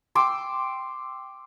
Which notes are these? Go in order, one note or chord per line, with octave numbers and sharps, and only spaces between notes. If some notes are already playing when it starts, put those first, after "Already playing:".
G5 C6 D6 E6